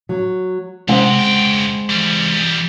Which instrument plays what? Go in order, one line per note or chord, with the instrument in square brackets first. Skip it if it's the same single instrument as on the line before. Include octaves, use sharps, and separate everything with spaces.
[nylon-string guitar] F#3
[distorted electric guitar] C3 [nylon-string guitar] G#3 C4 F#5
[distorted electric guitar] C#2 G5
E3 G3